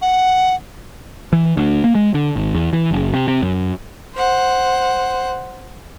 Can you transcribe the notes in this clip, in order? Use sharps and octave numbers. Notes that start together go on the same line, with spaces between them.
F#5
E3
D2
A#3
G#3
D3
G#1
E2
E3
F#1
C3
C3
F#2
C5 F#5